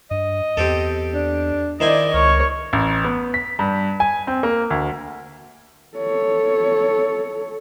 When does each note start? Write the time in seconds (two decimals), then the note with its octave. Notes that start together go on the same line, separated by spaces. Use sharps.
0.11 G2 D#5
0.57 E2 C4 G4 A4
1.14 D4
1.80 D#3 E4 C5 D5 D#5 G#5
2.14 C#2 A#4 C#5
2.73 A1
3.04 B3
3.34 B6
3.59 G2
4.00 G#5
4.27 C4
4.43 A#3
4.70 D2
5.97 A4 C#5